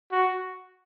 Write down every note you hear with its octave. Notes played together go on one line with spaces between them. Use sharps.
F#4